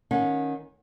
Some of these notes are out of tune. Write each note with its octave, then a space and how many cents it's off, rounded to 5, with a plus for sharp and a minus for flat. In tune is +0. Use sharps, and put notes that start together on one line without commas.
D#3 +0 C#4 +0 F#5 -35